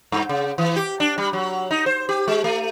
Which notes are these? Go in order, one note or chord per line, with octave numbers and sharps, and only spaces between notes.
G2
C#3
E3
G4
D4
G3
F#3
D#4
C5
G4
G#3
A3